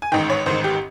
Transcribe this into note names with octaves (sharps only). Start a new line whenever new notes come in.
G#5
A1 G#2 D#3 G5
C#5
A1 G#2 D#3 C5
G4